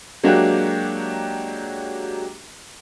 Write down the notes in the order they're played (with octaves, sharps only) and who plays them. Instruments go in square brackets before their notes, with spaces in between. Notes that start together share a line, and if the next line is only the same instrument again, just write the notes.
[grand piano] F#3 G#3 A#3 D4 F#4 G4